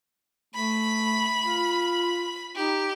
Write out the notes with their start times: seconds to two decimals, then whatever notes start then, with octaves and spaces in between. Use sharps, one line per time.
0.54 A3 B5
1.43 F4
2.56 D#4 G4